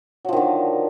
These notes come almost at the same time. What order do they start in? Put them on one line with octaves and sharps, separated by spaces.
F#3 F3 D#3 D3